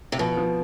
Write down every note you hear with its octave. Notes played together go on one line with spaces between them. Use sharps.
C3
B2 F3
F3